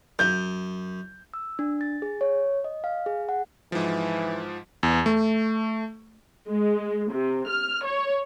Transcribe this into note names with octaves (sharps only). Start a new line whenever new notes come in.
F#2 G6
E6
D4
A6
G#4
C#5
D#5
F5
G#4
F#5
G#2 E3 F3
E2
A3
G#3
C3
F6
C#5